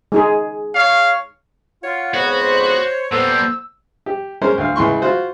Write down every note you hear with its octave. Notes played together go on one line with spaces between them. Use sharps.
G#3 D#4 G#4
C#5 F5
F4 C#5 F#5
F2 G#2 B3 F#4 C#5
C5
A#2 G3 B3 A4 C5 E6
G4
G#3 C#4 A#4 C5
D2 F5
C#2 E3 C6 C#6
F4 F#4 C5